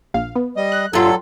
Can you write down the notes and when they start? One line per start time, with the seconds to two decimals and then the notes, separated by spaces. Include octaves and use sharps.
0.14 A#1 F5
0.36 B3
0.57 G3 D#5
0.72 F#6
0.93 G2 F#3 F4 A4